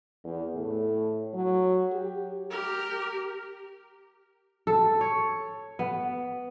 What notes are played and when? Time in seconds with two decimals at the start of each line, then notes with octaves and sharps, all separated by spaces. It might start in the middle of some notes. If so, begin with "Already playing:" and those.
0.24 E2
0.55 A2
1.34 F#3
1.92 G4
2.50 G4 A#4
4.67 A4
5.01 C#5
5.79 B3